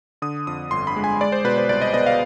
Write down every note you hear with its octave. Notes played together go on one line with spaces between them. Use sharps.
D3 D#6
F2 D#6
G1 C6
B5
G#3
G#5
G#3 D5
C5
B2 B4
C5
C2 D5
D#5
B3 D#5
F5